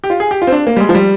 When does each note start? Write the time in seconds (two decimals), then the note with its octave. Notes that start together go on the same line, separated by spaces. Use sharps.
0.04 G4
0.10 F4
0.20 G#4
0.31 G4
0.42 F4
0.47 C4
0.52 D4
0.67 A#3
0.76 G3
0.80 G#3
0.89 F3
0.95 G3